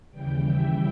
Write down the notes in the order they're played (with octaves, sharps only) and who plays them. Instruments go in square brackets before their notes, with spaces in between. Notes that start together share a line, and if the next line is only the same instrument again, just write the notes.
[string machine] D#2 C#3 E3 G3 G5
E5